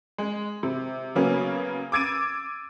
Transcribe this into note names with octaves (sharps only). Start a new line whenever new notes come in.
G#3
C3
C#3 F#3 A#3 B3 C#4
D6 E6 G#6 A6 D7 D#7